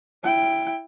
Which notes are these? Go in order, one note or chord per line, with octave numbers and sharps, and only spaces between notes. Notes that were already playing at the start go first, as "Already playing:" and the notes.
E4 G5